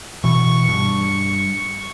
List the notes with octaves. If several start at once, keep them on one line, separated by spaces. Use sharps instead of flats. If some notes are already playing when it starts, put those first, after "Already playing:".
B2 E3 C#6
G2